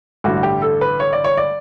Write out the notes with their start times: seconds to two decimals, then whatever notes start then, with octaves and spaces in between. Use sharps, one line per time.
0.24 A1 G2 D3 F#4
0.43 G4
0.62 A4
0.81 B4
1.00 C#5
1.13 D5
1.24 C#5
1.37 D5